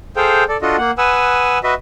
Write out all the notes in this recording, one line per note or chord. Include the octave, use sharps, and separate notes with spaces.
G#4 A4 C5 F5 G5
A4 D5
D4 F4 F#4 A4 D#5
A#3 F#5
B4 F#5 G#5 D#6 E6
F#4 B4 D#5 E5